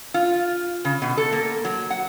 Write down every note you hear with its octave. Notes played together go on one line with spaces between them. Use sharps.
F4
C#3
B2
A4
A#3
F#3
F#5